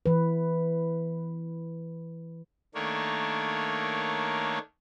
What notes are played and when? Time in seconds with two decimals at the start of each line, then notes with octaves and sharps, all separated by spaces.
0.06 E3 B4
2.75 D#3 A3 A#3 D4 C#5